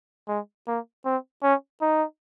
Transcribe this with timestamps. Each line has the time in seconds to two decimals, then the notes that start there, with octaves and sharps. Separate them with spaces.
0.28 G#3
0.67 A#3
1.05 C4
1.43 C#4
1.81 D#4